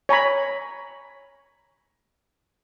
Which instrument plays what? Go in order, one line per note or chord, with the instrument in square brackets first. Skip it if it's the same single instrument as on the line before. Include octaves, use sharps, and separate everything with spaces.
[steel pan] C#5 G#5 A#5 B5